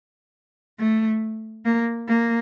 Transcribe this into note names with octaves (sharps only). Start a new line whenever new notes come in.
A3
A#3
A#3